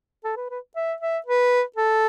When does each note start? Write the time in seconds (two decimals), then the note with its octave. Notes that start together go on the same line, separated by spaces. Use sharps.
0.24 A4
0.37 B4
0.50 B4
0.76 E5
1.01 E5
1.26 B4
1.76 A4